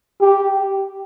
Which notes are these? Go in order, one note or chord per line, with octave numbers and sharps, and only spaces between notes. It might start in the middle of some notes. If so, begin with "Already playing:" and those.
G4